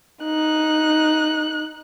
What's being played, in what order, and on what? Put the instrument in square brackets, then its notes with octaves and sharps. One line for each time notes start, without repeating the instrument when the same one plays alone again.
[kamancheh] D#4 F#6